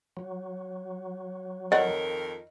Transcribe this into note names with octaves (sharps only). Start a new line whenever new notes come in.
F#3
F2 D#3 A#4 C#5 D#5 F#5